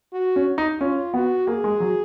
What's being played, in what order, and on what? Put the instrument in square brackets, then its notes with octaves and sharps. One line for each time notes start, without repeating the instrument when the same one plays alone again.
[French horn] F#4
[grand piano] C#4
D#4
[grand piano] C#4 [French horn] F4
[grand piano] B3 [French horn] F#4
[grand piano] A#3 [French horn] G#4
[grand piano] G#3
F#3